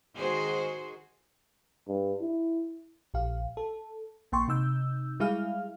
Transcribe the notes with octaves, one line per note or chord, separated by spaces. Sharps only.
D#3 G#3 F#4 G#4 C5
G2
E4
A#1 G4 F5
A4
A#1 A#3 G5 C6 C#6
C3 D#4 E6 G6
G3 G#3 E4 G#4 F5 F6